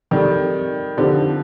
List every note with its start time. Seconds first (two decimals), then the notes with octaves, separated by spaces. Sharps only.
0.11 D#3 G3 C4 D#4 A4 D5
0.97 D3 F3 C4 D#4 G4 C5